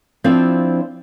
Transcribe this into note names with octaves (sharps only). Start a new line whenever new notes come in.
F3 C4 D4 E4 F4 F5